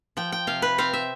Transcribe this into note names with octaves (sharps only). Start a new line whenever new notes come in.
F3 G5
G5
C3 F5
B4
C4 F5
E5